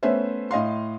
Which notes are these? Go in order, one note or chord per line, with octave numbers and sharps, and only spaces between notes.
A3 B3 C#4 C5 E5
A2 D#5 F5 C6